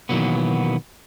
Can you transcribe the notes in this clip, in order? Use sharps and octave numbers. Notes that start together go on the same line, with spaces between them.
B2 D#3 E3 F#3 A#3 B3